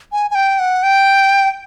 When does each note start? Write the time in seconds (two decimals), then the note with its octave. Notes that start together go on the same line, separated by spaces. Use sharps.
0.12 G#5
0.31 G#5
0.35 G5
0.59 F#5
0.83 G5